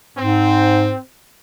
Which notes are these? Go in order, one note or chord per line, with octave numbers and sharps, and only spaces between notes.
G#2 C4